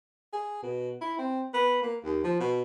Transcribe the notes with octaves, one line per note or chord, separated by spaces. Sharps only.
G#4
B2
E4
C4
B3
A#3
D#2
F3
B2